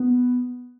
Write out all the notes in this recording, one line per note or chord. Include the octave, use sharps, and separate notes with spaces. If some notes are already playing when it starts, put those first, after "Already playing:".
Already playing: B3